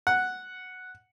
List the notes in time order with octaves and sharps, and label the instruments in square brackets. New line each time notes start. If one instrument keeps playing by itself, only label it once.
[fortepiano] F#5